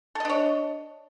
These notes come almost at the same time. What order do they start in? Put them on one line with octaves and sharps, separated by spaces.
A4 D#5 D4 C#5